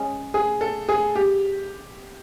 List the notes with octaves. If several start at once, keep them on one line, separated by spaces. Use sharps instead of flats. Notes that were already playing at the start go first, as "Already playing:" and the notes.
Already playing: G#3 C#4
G#4
A4
G#4
G4